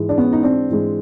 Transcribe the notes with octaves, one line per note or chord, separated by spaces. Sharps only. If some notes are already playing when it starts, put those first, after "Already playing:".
Already playing: G#2 E3 G#3
D4
B3 C#4
D#4
C4 D4
G#2 E3 G#3